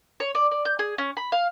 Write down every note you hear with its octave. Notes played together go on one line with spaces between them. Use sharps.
C#5
D5
D5
G6
G#4
C#4
B5
F5